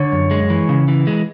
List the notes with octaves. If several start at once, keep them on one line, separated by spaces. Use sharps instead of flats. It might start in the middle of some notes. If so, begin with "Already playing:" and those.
Already playing: D3 C#5
F#2
G#3
E3
C#3
E3
G#3